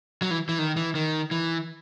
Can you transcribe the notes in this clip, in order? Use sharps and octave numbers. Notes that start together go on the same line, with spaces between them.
F#3
E3
E3
D#3
E3
D#3
E3